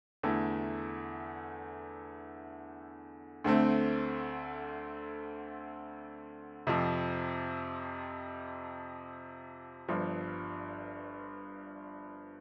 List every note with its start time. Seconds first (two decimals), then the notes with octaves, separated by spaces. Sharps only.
0.23 E2 D3 A3 E4
3.44 D2 D3 A3 C4
6.67 F2 C3 F3 C4
9.89 G1 G2 F3